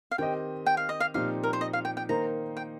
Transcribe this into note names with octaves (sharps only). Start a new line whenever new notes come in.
F5
D#3 C4 G4 D#5 G5
G5
F5
D#5
F5
A#2 F3 C4 D#4 G4 F5
A#4
C5
D#5
F5
G5
G5
D#3 A#3 D#4 C5 A#5
G5